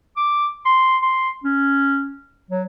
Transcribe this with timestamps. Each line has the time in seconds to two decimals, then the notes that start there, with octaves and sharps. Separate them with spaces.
0.17 D6
0.66 C6
1.02 C6
1.44 C#4
2.51 F#3